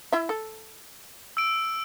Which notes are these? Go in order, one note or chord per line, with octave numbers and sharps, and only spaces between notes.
E4 E5
A4
E6 D7